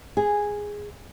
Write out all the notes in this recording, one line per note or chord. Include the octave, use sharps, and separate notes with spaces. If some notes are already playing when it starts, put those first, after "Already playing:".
G#4